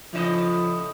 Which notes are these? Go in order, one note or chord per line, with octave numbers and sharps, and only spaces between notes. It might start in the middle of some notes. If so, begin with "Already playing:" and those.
A2 C#3 F3 D#5